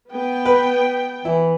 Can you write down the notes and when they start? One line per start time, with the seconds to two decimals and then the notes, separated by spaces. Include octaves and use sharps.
0.11 B3 G5
0.45 B4
1.25 E3 E4